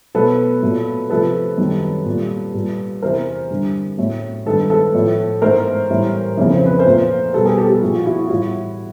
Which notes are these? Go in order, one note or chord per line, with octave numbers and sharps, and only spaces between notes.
B2 F#3 A3 A4 B4
A#2 F#3 A3
C3 F3 A3 A4 B4
F#2 D#3 G3
A#2 G3
A#2 G3
E2 C3 E3 A#4 C5
G2 D3 G3
A2 F#3 A3
G2 D#3 G#3 A4 B4
A4 B4
A2 F3 A3
G#2 E3 A3 A#4 C5
A2 E3 G3
F2 C#3 E3
C5
B4
A#4 C5
A#2 F3 A3
B2 G3 A4 B4
G#4 A#4
G4 A4
G4 A4
A#2 F3 A3 F#4 G#4
F4
E4 F#4
F4
A2 E3 G3 E4 F#4